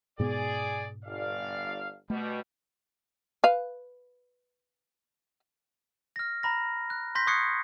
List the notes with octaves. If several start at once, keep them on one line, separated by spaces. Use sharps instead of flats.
G#2 B2 B3 G#4 D5
G1 D5 F5
B2 G3 A3
B4 F5
F6 A#6
A#5 B5 A#6
F#6
C6 G6 A#6 B6
C#6 D#6 F#6 G#6 C7 C#7